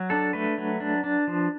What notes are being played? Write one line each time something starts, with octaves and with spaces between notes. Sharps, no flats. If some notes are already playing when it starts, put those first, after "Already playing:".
Already playing: F#3
D4 A4
A3 B4
F#3
D4
D4
F3